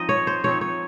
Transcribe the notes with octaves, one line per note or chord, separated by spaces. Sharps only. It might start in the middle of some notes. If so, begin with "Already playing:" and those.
Already playing: F3 C4 D#4 D#5
C#5
C5
F3 C4 D#4 C#5
C#5